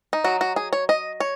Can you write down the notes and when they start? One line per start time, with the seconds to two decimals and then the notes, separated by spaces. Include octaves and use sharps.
0.13 D#4
0.24 F#3 D#4 F#4
0.41 F#4
0.56 G#4
0.73 C#5
0.89 D#5
1.20 C#5